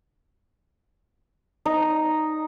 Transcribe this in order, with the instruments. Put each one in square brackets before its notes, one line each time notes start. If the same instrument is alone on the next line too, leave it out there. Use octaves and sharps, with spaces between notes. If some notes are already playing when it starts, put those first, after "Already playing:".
[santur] D#4